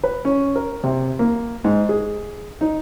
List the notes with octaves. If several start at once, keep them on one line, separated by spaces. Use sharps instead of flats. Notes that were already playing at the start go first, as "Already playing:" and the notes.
B4
C#4
A#4
C3
A#3
G#2
G#4
D#4